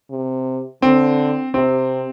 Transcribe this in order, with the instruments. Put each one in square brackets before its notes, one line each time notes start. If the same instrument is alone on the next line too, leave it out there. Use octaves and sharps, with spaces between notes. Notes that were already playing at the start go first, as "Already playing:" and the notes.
[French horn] C3
[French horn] D3 [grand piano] C4
[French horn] C3 [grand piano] C4